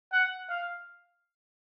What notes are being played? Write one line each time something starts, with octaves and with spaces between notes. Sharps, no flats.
F#5
F5